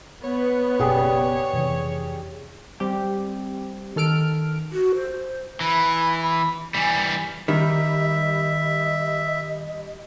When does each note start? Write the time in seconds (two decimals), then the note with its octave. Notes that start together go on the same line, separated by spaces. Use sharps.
0.24 B3 C#5
0.79 F#1 B2 C#4 G4 G#4 D5
1.53 F2 C3 E3
2.80 G3 C4 G4
3.96 D#3 A4 F6 D7
4.72 F#4
4.95 C5
5.61 E3 B5
6.74 E3 G3 G#5
7.48 D#3 G3 D#5 E5